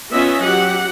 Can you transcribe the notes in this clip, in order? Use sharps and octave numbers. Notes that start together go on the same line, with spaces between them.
B3 C#4 F4 D#5 E5
F#3 G4 F#5